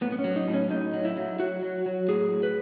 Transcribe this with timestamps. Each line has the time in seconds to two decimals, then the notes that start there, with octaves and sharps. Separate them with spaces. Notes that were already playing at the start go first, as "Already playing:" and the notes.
0.01 A2 B3
0.12 B3
0.19 C#4
0.24 F#3
0.36 D#4
0.48 A2
0.54 C#4
0.71 A2 D#4
0.94 F#3
1.05 E4
1.17 F#3
1.40 F#3 F#4
1.62 F#3
1.86 F#3
2.09 A2 G#4
2.32 A2
2.43 B4